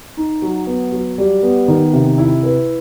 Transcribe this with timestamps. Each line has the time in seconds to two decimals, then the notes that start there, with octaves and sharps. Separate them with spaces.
0.17 D#4
0.42 F#3
0.67 B3
0.92 F#3
1.18 G3
1.43 B3
1.68 D#3
1.93 C3
2.18 E4
2.43 B4